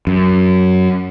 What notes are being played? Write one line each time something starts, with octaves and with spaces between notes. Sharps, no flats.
F#2